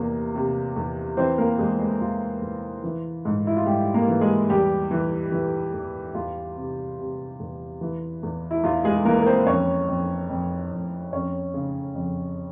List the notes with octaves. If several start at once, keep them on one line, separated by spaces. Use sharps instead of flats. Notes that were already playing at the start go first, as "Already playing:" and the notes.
Already playing: E2 C3 A#3
C3
E2
E3 C4 C5
A#3 A#4
E2 G#3 G#4
G#3 G#4
E2 F4
E2
E3
G#2
E4
F4
G#2 G3 G4
A#3 A#4
E3
G#3 G#4
E2 G3 G4
E3
E3
E2
E2 F4
C3
C3
E2
E3
E2
E4
E2 F4
G#3 G#4
E3 A#3 A#4
A#4
C4 C5
F2 C#4 C#5
F2
F2
F2
F2 C#4 C#5
C#3
F2